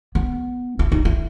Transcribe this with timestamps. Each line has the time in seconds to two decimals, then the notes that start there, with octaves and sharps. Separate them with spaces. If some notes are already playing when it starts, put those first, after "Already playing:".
0.15 B3
0.79 E4
0.92 D#4
1.05 E4